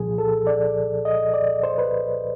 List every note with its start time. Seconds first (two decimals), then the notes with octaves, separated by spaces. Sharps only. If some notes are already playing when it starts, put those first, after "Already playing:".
Already playing: C2 A#2 F3 G#4
0.18 A4
0.47 D5
1.05 D#5
1.34 D5
1.63 C5
1.78 B4